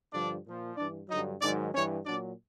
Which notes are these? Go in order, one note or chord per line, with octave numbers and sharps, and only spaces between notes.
G2 D3 F3 D4 D5
A#2 F3
G2 E3 D4 D5
G2 D3 F#3 D#4 D#5
G#2 D#3 F#3 D4 D5
G2 E3 C#4 C#5
A#2 F#3 D4 D5